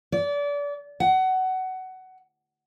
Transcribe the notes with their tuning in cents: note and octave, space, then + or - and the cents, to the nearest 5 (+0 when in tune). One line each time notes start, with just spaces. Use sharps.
D5 -30
F#5 +20